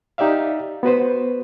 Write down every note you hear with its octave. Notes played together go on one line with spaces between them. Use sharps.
D#4 G4 D5 E5 F5
B3 F#4 B4 C5